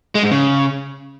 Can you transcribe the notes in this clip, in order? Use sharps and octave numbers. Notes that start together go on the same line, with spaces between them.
G#3
G#2
C#3